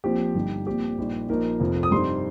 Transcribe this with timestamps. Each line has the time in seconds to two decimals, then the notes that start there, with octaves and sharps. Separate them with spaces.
0.04 A#1 A#2 F3 C4 G4
0.35 G1 G2 G3 D#4
0.66 A#1 A#2 G3 C4 G4
0.98 A#1 A#2 G3 D#4
1.29 A#1 A#2 F3 D#4 A#4
1.60 F1 F2 F3
1.83 D#6
1.91 G2 G3 C4 D#4 C6